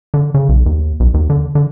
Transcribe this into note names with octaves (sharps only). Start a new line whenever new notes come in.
D3
C#3
B1
D#2
B1
D#2
D3
D3